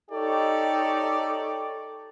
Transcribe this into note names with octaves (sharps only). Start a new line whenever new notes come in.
D#4 G4 A4 C#5 D5